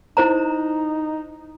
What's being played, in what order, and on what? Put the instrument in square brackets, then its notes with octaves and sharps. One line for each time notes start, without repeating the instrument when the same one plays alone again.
[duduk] D#4 [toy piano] E4 C5 A#5